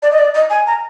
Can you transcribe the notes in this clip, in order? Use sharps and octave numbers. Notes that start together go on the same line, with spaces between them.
D5
D#5
D5
D#5
G#5
A#5